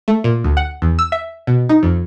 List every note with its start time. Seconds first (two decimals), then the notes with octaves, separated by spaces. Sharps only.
0.08 A3
0.24 A#2
0.44 D2
0.57 F#5
0.82 E2
0.99 E6
1.12 E5
1.47 B2
1.69 D#4
1.83 F2